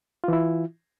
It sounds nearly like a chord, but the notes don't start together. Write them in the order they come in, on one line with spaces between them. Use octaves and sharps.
F4 E3 E4